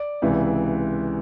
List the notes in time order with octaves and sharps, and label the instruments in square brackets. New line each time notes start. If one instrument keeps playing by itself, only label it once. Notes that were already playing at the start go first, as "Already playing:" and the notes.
Already playing: [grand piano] D5
C#2 C3 E3